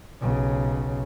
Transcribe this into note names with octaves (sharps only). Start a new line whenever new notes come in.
B1 C#3